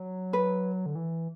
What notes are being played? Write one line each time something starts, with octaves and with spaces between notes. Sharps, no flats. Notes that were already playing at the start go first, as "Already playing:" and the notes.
Already playing: F#3
B4
D3
E3